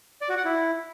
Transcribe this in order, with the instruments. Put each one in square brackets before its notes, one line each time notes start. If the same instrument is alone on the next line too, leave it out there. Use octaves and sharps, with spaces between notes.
[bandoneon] D5
F#4
F#5
E4